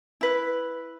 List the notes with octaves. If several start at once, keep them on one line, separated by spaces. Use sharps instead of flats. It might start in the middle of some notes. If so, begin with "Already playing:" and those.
E4 B4